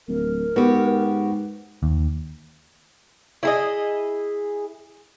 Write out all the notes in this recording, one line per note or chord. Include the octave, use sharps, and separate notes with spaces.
D1 A#4
G#2 B3 F#4 G4
D#2
E4 G#4 D#5